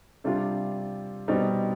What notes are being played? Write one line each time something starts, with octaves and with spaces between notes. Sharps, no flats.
C3 G3 D4 F4
B2 G3 C4 D#4